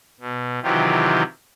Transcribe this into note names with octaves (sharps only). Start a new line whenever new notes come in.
B2
C3 D#3 E3 F#3 F4 G4